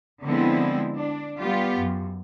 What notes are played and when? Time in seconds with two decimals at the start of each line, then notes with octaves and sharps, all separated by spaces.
0.24 D3 F3 G#3 B3 C4 E4
0.97 D4
1.41 G3 B3 F4 G4
1.79 F#2